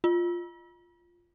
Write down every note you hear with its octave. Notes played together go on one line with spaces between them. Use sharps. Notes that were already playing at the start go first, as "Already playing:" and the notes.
F4